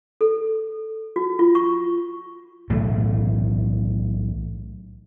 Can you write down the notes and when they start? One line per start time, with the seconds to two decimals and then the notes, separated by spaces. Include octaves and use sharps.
0.21 A4
1.16 F#4
1.39 F4
1.55 C#6
2.70 B1 A2 E3 A3